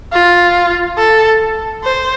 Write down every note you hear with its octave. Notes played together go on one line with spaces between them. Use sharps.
F4
A4
C5